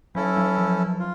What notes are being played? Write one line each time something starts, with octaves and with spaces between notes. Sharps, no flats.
F#3 C#4 E4 A4
F#3
F3
F4